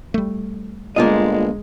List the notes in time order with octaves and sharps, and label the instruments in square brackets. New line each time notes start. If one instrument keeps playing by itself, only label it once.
[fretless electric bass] G3 A3
[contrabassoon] G1 [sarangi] G#3 [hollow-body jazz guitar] A#3 F4 D#5